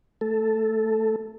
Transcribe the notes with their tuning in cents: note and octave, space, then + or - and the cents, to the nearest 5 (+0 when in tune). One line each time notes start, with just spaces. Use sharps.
A3 +0 A4 +0